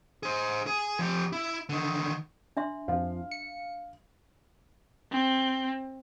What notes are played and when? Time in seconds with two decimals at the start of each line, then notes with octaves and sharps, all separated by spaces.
0.23 G#4 C5
0.67 G#4
0.99 F3 G4
1.32 E4
1.69 D3 D#3
2.57 D4 E5 C6
2.88 F2 F3 F5
3.31 C#7
5.12 C4